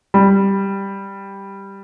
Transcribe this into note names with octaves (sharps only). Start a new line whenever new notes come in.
G3